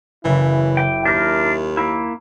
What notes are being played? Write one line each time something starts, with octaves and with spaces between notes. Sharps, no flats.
F#1 C#3 E3 E4
G5 D6
D#2 D4 A#4 G6
A#3 E4